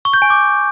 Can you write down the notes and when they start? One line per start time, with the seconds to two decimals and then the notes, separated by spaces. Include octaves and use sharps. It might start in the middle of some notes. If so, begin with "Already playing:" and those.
0.05 C#6
0.14 G6
0.22 G#5
0.30 D6